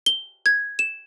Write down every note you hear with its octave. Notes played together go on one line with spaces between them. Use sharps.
G7
G#6
E7